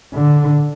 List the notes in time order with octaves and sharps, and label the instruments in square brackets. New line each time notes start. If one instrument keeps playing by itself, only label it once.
[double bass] D3